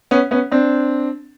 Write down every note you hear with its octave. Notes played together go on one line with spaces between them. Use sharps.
B3 C#4
B3 C#4
C4 D4